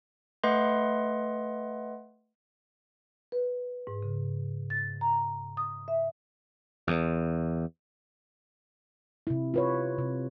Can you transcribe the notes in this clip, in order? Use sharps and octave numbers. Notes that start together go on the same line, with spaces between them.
A3 B4 D#5 F#5 C6
B4
G#2
C#3
A6
A#5
D#6
E5
E2
C3 E4
F4 B4 C#5
C3